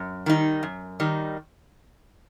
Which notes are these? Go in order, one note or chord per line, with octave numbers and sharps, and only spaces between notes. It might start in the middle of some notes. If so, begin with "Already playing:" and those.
Already playing: F#2
D#3 G3 D#4
F#2
D#3 G3 D#4